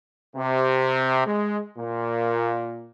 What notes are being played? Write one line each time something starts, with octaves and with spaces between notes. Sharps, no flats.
C3
G#3
A#2